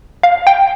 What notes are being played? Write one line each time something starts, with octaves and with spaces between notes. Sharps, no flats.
F5
G5